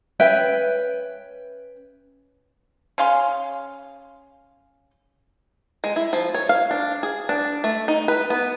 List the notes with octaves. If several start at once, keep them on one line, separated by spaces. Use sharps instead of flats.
C#4 B4 E5 G5
C#4 G#4 F5 C6
G#3
E4
F3
C#5
F5
D4
G#4
D4
A3
D#4
B4
B3